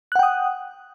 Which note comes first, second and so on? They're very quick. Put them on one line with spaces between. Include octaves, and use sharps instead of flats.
F#6 F#5 G5 D#6